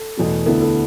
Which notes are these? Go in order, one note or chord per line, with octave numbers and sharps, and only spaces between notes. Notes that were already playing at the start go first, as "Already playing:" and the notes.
Already playing: A4
E2 B2 A3
D2 D3 B3 E4 A4
A4